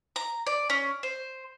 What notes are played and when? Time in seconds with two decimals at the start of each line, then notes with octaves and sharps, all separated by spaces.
0.16 A#5
0.47 D5
0.70 C#4
1.03 C5